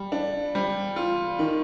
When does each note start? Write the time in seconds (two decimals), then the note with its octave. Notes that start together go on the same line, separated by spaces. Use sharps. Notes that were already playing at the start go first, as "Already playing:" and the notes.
Already playing: G3
0.12 D4
0.55 G3
0.96 F4
1.39 D#3